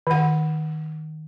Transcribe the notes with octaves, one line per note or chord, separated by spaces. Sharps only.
D#3 F#5